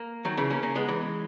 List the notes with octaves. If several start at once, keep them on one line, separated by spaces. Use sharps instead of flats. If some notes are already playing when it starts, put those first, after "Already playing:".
Already playing: A#3
D#3 F#3
C#3 E3
A#3 C#4
A#3 C#4
G#3 B3
E3 G#3